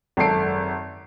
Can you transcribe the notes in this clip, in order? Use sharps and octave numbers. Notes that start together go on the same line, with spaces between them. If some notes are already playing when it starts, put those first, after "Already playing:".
G#1 F#2 A4 A5 C7 D7